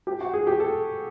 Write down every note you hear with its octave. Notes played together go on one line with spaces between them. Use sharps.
G4
F#4
G#4
G4
A4